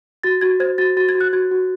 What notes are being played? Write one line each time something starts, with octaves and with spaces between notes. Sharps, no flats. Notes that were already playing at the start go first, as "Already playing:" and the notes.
F#4 A6
F#4 G#6
C5 G#6
F#4 A6
F#4 A6
G#6
F#4
F#6
F#4 G#6
F#4